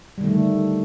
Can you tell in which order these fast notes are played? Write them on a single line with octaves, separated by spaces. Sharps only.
G3 D#3 A3 D3